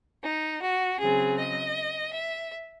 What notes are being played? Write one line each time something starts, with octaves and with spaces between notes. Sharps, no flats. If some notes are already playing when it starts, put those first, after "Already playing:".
D#4
F#4
C#3 F#3 C4 G#4
D#5
E5